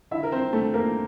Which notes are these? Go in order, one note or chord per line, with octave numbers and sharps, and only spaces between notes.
D3 E4 E5
A#4
C4 C5
D3 A3 A4
A#3 A#4